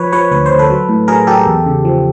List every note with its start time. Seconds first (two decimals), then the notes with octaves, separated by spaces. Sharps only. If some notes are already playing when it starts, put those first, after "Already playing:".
Already playing: F3 B4 C#5
0.12 F3 B4 C#5
0.31 D2 B4
0.46 C5
0.51 D2
0.59 A4 B4
0.70 F#3
0.89 A2
1.08 F#3 G#4 A#4
1.27 F#3 G4 A4
1.47 E2
1.66 C#3
1.85 F3